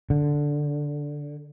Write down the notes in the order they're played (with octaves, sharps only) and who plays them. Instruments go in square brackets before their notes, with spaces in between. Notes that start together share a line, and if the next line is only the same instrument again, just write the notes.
[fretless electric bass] D3